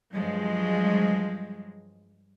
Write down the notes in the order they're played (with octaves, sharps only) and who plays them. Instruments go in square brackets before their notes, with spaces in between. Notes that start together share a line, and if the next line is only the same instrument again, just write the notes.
[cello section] G2 F3 F#3 G#3